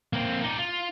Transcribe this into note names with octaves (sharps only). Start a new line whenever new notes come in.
A#3 C4
D#4 D5
F4